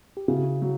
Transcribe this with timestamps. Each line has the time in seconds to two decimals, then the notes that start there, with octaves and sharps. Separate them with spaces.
0.17 G4
0.28 C#3 E4 F#4
0.62 F#3